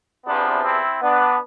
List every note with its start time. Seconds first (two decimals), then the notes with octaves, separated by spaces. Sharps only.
0.24 E2 C3 F3 B3 D4
0.63 C4 E4
1.02 B3 D4